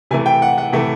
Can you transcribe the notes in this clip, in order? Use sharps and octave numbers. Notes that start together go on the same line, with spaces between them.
C3 E3 A3 G#5
G5
F#5
F#5
C3 E3 A3